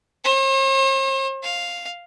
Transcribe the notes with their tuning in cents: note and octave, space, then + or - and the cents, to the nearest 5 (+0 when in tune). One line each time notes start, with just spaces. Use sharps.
C5 +45
F5 +0